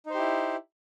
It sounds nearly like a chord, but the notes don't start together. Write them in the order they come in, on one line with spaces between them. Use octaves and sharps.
D#4 C5 G4 E4